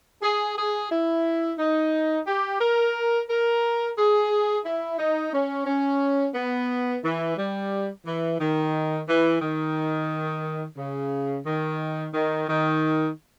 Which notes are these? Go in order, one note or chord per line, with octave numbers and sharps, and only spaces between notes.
G#4
G#4
E4
D#4
G4
A#4
A#4
G#4
E4
D#4
C#4
C#4
B3
E3
G3
E3
D#3
E3
D#3
C#3
D#3
D#3
D#3